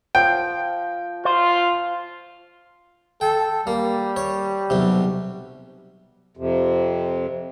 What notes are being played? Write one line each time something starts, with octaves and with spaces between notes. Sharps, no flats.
F3 G5
F4 C5
A4 G5
G3 A#3
C#5
B1 C3
F2 C3